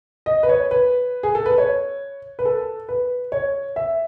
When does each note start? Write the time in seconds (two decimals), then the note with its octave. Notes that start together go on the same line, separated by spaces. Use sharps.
0.26 D#5
0.43 B4
0.49 C#5
0.71 B4
1.23 G#4
1.35 A4
1.46 B4
1.58 C#5
2.39 B4
2.45 A4
2.89 B4
3.32 C#5
3.76 E5